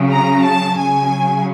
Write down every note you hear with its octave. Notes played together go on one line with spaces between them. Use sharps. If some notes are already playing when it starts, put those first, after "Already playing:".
Already playing: C#3 F#3
A#5
A5
C#3 F#3 G#5